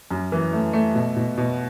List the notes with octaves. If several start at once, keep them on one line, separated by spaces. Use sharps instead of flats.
F#2
E3
A3
A3
B2
B2
B2